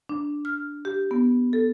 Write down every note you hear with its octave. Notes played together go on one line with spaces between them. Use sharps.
D4
F6
G4
B3
A4